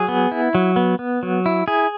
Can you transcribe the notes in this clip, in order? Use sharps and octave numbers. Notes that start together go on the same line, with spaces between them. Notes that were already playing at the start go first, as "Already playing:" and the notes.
Already playing: F#3 G#4
B3
E4
F#3
B3
B3
F#3
E4
E4 G#4